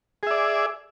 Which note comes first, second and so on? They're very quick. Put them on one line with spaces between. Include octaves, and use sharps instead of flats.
G#4 E5 D5